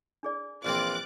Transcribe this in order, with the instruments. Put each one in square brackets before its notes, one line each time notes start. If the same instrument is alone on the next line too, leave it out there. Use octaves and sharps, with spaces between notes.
[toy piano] D4 G#4 D5
[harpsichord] A#1 E3 C4 [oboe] F4 [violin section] D6 F#6 A6